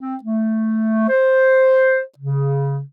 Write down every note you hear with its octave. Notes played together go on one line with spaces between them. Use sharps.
C4
A3
C5
C#3